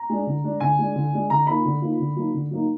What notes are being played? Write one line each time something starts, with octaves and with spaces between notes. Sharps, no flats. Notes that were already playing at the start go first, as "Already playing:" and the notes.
Already playing: A#5
G#3 D4
D3
G#3 D4
D3 G#5
G#3 D4
D3
G#3 D4
D3 A#5
F3 A#3 D#4 B5
D3
F3 A#3 D#4
D3
F#3 A#3 D#4
D3
F#3 A#3 D#4